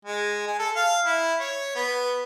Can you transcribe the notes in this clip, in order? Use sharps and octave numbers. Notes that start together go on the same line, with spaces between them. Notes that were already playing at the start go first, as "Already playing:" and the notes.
G#3
G#4
A4
F5
E4
C#5
B3